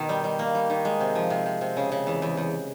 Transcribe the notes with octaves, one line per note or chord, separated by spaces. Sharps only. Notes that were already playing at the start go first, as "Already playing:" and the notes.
Already playing: B2 D#3
G3
G3
A#3
G3
D#3
G#3
C3
F3
C3
C3
C3
C#3
C#3
E2
E2
E2